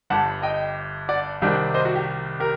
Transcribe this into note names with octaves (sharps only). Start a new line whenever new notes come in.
G1 G2 D3 F#5 A5
D#5 G5
D5 F#5
C2 C3 D#3 G3 D4
C5 D#5
F#4
G4
G4 A#4